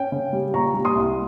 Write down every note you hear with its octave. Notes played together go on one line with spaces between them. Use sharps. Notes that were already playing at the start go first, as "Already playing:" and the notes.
Already playing: C#4 G5
C#3
G3
A#2 A#5 C#6
G3
C6 D#6
C2